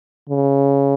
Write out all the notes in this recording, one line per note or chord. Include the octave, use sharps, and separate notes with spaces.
C#3